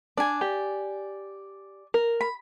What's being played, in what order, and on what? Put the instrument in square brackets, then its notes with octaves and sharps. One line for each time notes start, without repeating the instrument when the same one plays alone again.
[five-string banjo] D4 [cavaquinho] D5 G#5
[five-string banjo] G4
A#4
[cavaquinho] B5